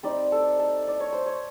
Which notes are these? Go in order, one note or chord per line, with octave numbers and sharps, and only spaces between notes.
G3 C4 D#4 D5
A4
A4
D5
C#5
C5
C#5